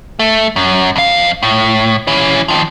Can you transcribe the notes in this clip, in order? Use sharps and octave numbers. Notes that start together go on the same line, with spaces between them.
A3
F#2
F2 F5
A2
E3 C#4
D#3 F3